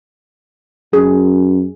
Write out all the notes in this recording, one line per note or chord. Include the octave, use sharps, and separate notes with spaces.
F#2 G#4